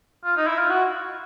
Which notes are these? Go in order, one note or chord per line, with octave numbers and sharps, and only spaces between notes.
F4
D#4
E4
F4
F#4